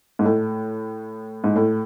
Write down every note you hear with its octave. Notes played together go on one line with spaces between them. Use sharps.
G#2
A2
G#2
A2